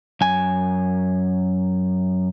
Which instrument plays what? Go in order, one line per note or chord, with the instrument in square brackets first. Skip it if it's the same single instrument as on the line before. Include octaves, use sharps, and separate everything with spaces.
[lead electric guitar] F#2 G#5